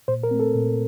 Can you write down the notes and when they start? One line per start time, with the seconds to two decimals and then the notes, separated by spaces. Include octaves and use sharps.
0.08 A#2 C5
0.23 A#4
0.31 A3 C4
0.40 A4
0.55 A#2